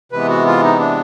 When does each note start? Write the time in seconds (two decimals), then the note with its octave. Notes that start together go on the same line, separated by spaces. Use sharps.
0.12 C3 E3 G#3 B3 B4
0.29 F#4
0.46 F4
0.63 D#4
0.79 D4